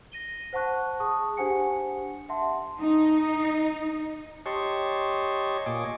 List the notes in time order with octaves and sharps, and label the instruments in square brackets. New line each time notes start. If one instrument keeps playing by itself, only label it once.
[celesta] A#6 D#7 G7
C5 F#5 A5 C#6 F#6
G#4 A5 C#6 D#6
D4 G4 C5 F#5 G#5 C#7
E5 F#5 A5 C6
[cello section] D#4
[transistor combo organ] G4 C#5 D#5 A5 C6 C#6
A#2 D#5 G#5 D6